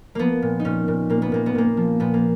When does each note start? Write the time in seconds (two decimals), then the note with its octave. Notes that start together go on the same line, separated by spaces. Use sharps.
0.15 F3 A#3 B3
0.42 A#2
0.60 D#4
0.65 A#2 C#4
0.88 A#2
1.10 A#2 A#3
1.22 B3
1.32 A#2 A#3
1.46 B3
1.55 A#2 A#3
1.77 F3
2.00 A#2 B3
2.14 A#3